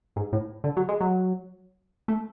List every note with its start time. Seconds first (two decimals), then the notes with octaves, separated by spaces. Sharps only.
0.16 G#2
0.33 A2
0.64 D3
0.77 F#3
0.89 G#3
1.01 F#3
2.08 A3